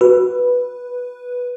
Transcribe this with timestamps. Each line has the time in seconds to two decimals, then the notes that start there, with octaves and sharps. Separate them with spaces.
0.01 F#4 B4